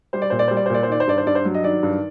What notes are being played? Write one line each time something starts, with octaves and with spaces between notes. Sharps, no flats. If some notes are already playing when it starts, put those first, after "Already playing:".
G3 C5
D5
A#2 C5
D5
G3 C5
D5
C5
A#2 D5
C5
D#3 D5
C5
G2 D5
C5
G2 D5
C5
F#3
D#5
D#3 D5
G2